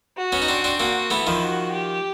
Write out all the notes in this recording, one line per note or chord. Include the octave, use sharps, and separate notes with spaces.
F#4
B3 C#4
D#4
C4 D4
C4 D4
A#3 C4 F#4
A3 B3 E4
D#3 F3
F#4
G4